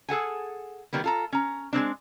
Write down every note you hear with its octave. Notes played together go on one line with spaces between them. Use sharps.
G#4 A4 F#5 G#5
D#3 G3 A#3 B3
F4 A4 A#5
C#4 A#5
G#3 A#3 C4 D4